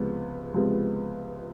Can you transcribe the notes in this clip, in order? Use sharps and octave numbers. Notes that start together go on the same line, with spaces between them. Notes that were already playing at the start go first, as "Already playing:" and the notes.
Already playing: C#2 C3 F3 G#3 B3
C#2 C3 F3 G#3 B3